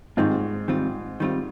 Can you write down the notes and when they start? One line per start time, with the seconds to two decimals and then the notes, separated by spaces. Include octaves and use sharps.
0.17 G#2 D#3 G3 C4 F4
0.68 D#3 G3 C4 F4
1.20 D#3 G3 C4 F4